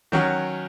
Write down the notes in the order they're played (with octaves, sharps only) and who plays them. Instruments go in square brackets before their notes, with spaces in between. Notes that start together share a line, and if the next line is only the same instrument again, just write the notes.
[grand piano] D#3 F#3 C#4 F#4